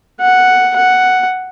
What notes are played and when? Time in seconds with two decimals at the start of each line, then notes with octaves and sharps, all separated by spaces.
0.20 F#5
0.75 F#5